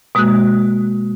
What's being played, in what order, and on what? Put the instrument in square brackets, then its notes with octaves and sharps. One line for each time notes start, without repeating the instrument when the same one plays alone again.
[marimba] B2 G#3 A#3 F#4 F#6